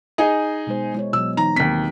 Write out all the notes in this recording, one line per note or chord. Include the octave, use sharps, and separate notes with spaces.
D#4 G#4 D#5
B2 G#3 C5
G#3 E4 C#5
B2 F#3 E6
E3 D#4 A#5
D#2 C4 B6